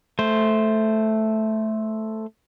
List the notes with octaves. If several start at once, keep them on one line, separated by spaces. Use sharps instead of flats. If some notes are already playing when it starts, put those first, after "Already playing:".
A3 C5